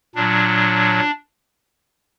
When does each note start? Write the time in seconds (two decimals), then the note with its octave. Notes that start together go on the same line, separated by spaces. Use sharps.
0.15 A#2 F#3 D4